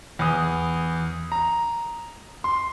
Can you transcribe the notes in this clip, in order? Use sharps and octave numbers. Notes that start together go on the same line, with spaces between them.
E2 D#6
A#5
C6